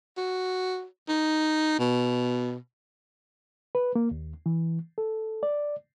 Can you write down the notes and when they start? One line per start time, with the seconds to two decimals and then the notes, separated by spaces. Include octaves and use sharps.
0.17 F#4
1.09 D#4
1.79 B2
3.75 B4
3.95 A#3
4.11 D#2
4.46 E3
4.98 A4
5.43 D5